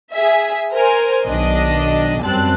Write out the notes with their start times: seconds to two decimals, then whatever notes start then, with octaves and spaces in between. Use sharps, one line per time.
0.13 G#4 E5
0.75 A#4 C5 G#5
1.27 B1 D#3 D4 D#5
2.22 F#2 G3 C4 A5 F#6